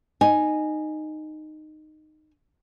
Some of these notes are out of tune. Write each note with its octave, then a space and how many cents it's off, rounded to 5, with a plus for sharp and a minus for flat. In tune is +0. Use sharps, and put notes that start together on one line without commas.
D#4 -15 G#5 +0